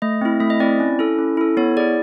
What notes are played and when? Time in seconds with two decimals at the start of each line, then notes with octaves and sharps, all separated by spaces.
0.02 A3 D#5
0.21 C4 E4
0.40 A3 E5
0.50 D#5
0.60 C4 E4 D5
0.80 C#4
0.99 E4 A4
1.19 C#4
1.37 E4 A4
1.57 B3 C#5
1.77 G#4 D5
1.80 E4